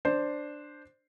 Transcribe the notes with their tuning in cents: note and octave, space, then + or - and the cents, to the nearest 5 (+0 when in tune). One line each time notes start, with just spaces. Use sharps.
D4 +5 C5 +0